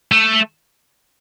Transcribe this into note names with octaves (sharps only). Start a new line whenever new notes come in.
A3